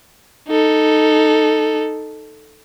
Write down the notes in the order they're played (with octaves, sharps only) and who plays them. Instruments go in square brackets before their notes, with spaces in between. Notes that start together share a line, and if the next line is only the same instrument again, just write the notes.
[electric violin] D#4 A4